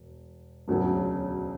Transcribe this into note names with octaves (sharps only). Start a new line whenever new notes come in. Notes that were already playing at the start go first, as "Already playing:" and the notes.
Already playing: E1
E1 D2 C#3 F#3